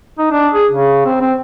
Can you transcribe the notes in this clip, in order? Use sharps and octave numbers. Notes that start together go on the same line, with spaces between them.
D#4
D4
G#4
C#3
C4
C4